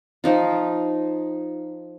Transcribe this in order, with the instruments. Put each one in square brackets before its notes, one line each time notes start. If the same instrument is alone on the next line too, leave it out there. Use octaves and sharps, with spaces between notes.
[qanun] F3 D#4 F4